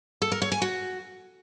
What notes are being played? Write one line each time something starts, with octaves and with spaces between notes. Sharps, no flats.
A4
A#4
C#5
G#5
F#4